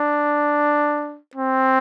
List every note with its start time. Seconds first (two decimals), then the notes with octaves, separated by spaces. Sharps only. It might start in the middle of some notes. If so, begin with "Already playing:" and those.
Already playing: D4
1.35 C4